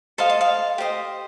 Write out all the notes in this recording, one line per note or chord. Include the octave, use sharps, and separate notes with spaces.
A4 C5 D#5 F5
D#5
F5
G4 C5 D#5